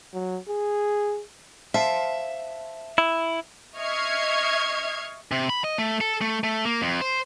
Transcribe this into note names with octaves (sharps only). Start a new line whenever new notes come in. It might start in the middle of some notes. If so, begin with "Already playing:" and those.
F#3
G#4
C5 E5 F5 A5
E4
D#5 E5 C#6 F6 G#6 C7
C3
B5
D#5
A3
A4
A3
A3
A#3
F2
C5